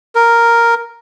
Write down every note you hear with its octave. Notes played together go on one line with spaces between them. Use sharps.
A#4